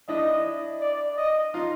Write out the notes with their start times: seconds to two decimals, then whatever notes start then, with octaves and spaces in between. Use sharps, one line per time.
0.08 D4 E4 D#5
0.81 D5
1.18 D#5
1.54 D#4 F4